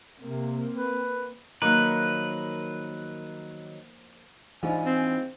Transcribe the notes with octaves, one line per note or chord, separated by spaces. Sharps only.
C3 A#3 C4
B4
D#3 F3 F#3 A#3 B4 A#5 D6 F#6
G#2 E3 F3 D4 G#5
C4